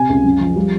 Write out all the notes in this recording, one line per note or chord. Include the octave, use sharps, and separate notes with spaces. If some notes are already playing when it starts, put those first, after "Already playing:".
Already playing: C3 G#5
C#2
F#2
F3
G3